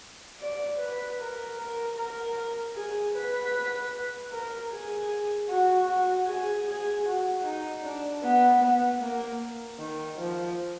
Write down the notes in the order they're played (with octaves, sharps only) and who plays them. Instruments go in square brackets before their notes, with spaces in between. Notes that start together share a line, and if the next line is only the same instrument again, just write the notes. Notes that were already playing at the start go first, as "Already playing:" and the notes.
[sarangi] D5
B4
A#4
A#4
A#4
G#4
B4
A#4
G#4
F#4
F#4
G#4
G#4
F#4
D#4
D4
B3
B3
A#3
D#3
F3